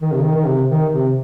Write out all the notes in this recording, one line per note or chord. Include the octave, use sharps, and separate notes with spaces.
D#3
C3
D#3
D#3
C3
D#3
C3